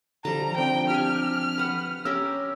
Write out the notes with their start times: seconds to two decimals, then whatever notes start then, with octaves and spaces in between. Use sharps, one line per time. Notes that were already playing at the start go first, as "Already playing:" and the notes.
0.25 D3 F3 G3 A5 A#5
0.57 F3 C4 D4 G5
0.90 G4 G#5 F6
1.58 B4 F#5
2.05 C#4 G4 A#4 E6